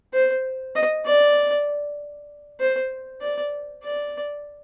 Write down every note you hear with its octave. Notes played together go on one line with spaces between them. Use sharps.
C5
D#5
D5
C5
D5
D5